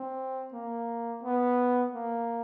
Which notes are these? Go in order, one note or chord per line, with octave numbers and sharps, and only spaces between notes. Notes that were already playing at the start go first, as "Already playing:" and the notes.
Already playing: C4
A#3
B3
A#3